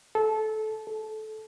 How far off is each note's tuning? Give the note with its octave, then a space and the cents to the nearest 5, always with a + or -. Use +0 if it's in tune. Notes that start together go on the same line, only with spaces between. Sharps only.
A4 -20
A4 -20